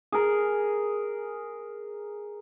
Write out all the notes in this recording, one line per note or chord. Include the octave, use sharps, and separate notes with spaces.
G#4 A#4